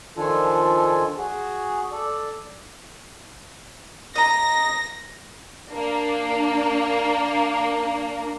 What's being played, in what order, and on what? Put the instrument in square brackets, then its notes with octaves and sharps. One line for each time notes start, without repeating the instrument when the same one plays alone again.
[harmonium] D#3 F3 D4 F4 A4 G#5
F#4 G#4
A4 D5
[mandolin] D#5 A#5 [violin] A#6
[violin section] A#3 D4